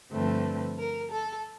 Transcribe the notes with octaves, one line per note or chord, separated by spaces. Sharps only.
G2 D3 F3 A3 C4 B4
A#4
A4